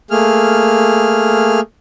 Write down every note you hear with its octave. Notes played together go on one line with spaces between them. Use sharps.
A3 A#3 G#4 F6